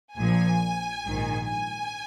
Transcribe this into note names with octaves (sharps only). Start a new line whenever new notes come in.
A#1 A#2 F3 G#5
A#1 G#2 D#3
G#5